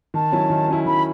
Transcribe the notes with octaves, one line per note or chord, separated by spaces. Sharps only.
D#3 A5
F#3 C#4 E4
D#3
F#3 C#4 E4
D#3 B5